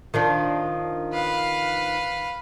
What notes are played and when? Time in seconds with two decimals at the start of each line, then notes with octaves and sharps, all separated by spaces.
0.14 D#3 F3 D4
1.13 B4 F5